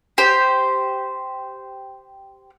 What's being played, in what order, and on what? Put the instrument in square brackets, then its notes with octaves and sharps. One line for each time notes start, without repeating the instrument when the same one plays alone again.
[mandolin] G4 C5